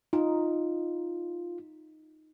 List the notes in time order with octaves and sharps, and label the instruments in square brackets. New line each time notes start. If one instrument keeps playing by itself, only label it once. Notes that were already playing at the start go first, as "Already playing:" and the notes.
[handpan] D#4 [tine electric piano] F4